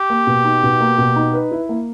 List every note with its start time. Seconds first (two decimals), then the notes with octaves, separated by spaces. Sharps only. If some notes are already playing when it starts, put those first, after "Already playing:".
Already playing: G4
0.10 A#3
0.27 B2
0.44 D#4
0.63 B2
0.80 A#3
0.98 B2
1.16 D#4
1.34 B4
1.52 E4
1.69 A#3